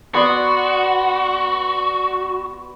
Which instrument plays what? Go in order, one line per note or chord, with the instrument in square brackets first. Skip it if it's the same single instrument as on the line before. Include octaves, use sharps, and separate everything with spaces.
[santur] B3 D5 C6 [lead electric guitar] F#4